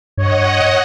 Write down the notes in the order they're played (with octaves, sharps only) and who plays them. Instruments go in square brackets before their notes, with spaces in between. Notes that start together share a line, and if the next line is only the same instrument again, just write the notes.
[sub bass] G2 [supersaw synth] C#5 [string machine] D#5 F#5